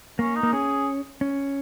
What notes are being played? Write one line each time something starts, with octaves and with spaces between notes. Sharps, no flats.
A#3 C#4
D#4
A#3
C#4 G#4
C#4